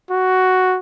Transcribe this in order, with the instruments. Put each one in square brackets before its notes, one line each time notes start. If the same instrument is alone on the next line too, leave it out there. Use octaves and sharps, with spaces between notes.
[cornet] F#4